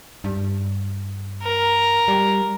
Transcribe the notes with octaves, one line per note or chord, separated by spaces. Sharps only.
G2
A#4
G3